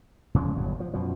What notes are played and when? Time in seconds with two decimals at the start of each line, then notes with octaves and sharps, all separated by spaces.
0.34 E2 C#3 F3 G#3
0.56 G1 A2 F#3
0.80 F3
0.94 F#2 B2 F3